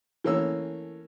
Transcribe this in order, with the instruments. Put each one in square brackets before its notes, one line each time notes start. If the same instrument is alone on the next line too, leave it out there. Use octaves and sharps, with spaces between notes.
[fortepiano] E3 A3 A#3 C#4 E6